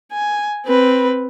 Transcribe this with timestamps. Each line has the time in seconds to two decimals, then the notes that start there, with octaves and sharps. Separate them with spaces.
0.12 G#5
0.66 C4 B4